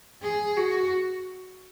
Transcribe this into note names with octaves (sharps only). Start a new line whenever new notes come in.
G#4
F#4